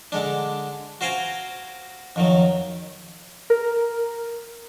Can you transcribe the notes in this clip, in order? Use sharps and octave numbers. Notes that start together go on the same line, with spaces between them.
D3 G#3 D4
F#4 C5 F5 G5 G#5 A#5
F2 D#3 F#3
A#4